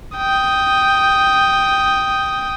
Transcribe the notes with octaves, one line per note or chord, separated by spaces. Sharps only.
G5 D#6